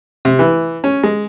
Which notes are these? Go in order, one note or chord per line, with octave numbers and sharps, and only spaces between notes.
C3
E3
C#4
G#3